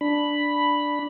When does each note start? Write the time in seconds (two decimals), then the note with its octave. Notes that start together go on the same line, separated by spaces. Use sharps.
0.01 D4 B5